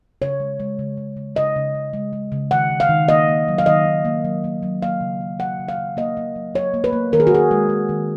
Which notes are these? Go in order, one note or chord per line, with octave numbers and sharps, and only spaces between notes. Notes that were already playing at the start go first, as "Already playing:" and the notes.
C#3 C#5
G#3
G#3
C#3
C#3
C#3
C#3 D#5
C#3
C#3
G#3
G#3
C#3
D#3 F#5
D#3
F5
D#3
A#3 D#5
A#3
F#3
F5
D#3 D#5
D#3
A#3
F#3
A#3
F#3
A#3 F5
C#3
A#3
A#3 F#5
C#3
F5
C#3
A#3 D#5
A#3
F#3
F#3 C#5
A#3
B4
A#3
D#3 A#4
G#4
F#4
D#3 G#4
G#3
G#3
D#3